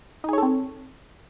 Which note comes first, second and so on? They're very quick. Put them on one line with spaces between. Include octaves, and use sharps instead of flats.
D#4 G#4 C#5 A4 C4